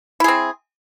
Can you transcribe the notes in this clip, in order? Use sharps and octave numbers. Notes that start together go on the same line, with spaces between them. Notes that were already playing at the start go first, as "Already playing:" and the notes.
C4 E4 G#4